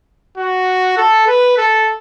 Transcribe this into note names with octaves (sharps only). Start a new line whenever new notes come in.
F#4
A4
B4
A4